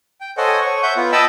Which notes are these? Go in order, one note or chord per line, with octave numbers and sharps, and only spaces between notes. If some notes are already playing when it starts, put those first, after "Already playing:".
G5
A4 C5 C#5 D#5 F#5 G#5
C#5 C#6
E5 F#5 C#6 G6
B3 F4
D#5 G5 A5 B5 E6